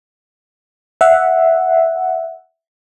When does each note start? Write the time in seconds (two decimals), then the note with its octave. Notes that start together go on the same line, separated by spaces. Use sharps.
1.01 E5 F#5